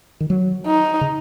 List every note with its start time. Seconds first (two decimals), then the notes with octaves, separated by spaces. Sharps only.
0.20 D#3
0.30 F#3
0.66 D#4
1.01 C#3